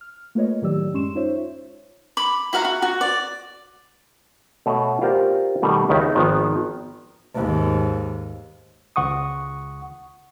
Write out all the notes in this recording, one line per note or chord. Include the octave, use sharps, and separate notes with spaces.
F6
A3 A#3 F4 B4 C#5 D#5
A2 D#3 F#3 G4 D5 E6
F#2 G#3 C#4 C6 C#6 E7
D#4 F4 C5 C#5 E5
B5 D6
E4 F#4 F5 A#5
F#4
F#4
D5
B2 A3 C#5 D#5 E5
F4 G4 A#4 C5 D5
B2 D#3 G3 A3
C#2 D#3 E4 G4
D#4
G#1 D#3 F3 B3
D#2 G#2
C#2 F#5 C#6 D#6